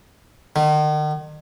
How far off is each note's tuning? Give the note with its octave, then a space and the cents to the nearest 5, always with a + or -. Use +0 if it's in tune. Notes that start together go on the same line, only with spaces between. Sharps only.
D#3 -40